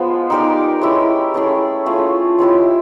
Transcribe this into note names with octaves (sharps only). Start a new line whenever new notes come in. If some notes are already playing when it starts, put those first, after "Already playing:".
Already playing: F3 G#3 B3 F4
D#4 G4 A#4 D5
G#3 C#4 E4 G4
A3 C#4 E4 G#4
A3 C#4 F4 G#4
G#3 C#4 E4 G4